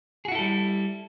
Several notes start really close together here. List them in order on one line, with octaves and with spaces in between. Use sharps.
G#4 F#4 E4 A4 G3